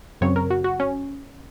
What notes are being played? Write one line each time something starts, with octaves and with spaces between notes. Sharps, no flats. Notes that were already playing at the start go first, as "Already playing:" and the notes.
F#2 C#3 F#3 C4 C#5
A#4
F#4
F#4
C#4